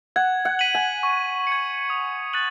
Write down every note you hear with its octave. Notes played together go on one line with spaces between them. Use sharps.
F#5 G#6
F#5
B6 D#7 F#7
G#5
C#6
C#7
G#6
D#6
F#6 A6 D#7 F#7